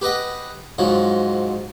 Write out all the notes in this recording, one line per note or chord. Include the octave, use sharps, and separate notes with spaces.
G4 B4 D#5 F#5
G#2 F3 F#3